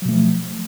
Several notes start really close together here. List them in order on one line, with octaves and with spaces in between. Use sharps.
F#3 B2 A3 F3